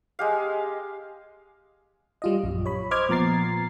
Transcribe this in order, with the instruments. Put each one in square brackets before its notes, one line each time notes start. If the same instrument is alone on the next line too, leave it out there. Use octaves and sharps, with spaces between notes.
[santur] G#3 G4 F5
[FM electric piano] G3 F4 D#5
A#1 F#2
C#5 B5
C5 D#5 D6 F6 G#6
A#2 F3 B3 A#5 A6 C7